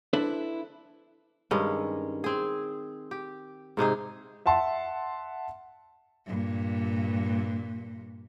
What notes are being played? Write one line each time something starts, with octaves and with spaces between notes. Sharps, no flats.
D4 E4 A4 B4 C5
G2 D#3 G#3 C#4
C4 G#4
G4
G#2 C3 D#4 G#4
E5 F#5 A5 C6
G2 A#2